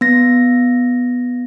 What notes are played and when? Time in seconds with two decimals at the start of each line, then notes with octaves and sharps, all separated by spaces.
0.01 B3 A#6